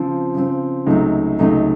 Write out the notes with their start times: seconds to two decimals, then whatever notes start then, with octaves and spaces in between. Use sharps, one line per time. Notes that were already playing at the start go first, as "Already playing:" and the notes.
Already playing: C#3 F3 C4
0.35 C#3 F3 C4
0.86 C#2 C3 F#3 A3 D#4
1.39 C#2 C3 F#3 A3 D#4